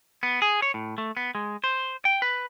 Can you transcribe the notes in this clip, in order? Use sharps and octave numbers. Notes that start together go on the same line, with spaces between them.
B3
G#4
C#5
A2
A3
B3
G#3
C5
G5
B4